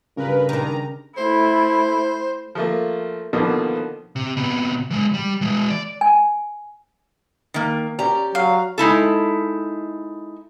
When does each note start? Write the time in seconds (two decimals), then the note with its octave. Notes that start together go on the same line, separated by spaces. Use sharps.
0.17 G2 C#3 A#4 B4
0.49 D#3 D4 A#5
1.17 A3 E4 C5
2.55 F3 A3 A#3
3.33 B2 D3 D#3 F3 A#3 B3
4.16 C3
4.37 C3 B3
4.90 E3 G#3
5.14 G3
5.41 E3 G#3
5.70 D5
6.01 G#5
7.54 D#3 A#3
7.99 C#4 G4 D5 A#5
8.35 F#3 F5
8.78 G#3 D#4 E4 A4